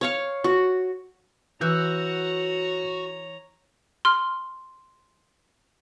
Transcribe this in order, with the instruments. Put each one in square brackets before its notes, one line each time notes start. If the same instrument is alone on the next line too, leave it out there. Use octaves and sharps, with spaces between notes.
[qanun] C#5 F5 C#6
F#4
[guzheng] E3 [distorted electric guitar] F#4 [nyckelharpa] C#5 A#5 [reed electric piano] E6 F#6 G6
[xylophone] C6 F6